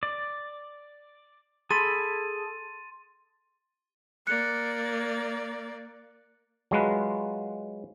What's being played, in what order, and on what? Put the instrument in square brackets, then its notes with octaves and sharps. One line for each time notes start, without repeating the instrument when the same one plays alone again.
[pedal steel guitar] D5
[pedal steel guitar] G#4 A4 B5 [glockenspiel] C6 A6 D#7
[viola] A#3 D5 [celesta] F#6 C#7
[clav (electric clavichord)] F#3 G#3 F4 B4